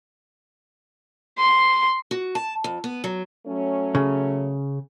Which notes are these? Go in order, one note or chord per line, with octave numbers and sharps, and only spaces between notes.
C6
F#4
A5
F2
B3
F#3
F#3 A3 C#4
C#3